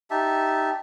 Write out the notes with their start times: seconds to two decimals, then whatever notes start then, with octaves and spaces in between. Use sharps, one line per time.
0.10 D#4 G4 E5 A5